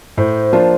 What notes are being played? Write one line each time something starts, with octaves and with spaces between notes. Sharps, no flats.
A2 C5
F3 A#3 D4 F4